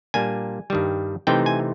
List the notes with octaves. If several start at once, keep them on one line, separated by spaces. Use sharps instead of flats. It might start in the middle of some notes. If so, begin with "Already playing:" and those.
A#2 G3 A#3 D4 G#5
G2 D#3 G3
C3 E3 A3 C4 D#4 G5
G#5